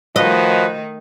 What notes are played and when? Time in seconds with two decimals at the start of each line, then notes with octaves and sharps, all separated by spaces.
0.16 D#3 F3 A3 D#4 F#4 B4 D#5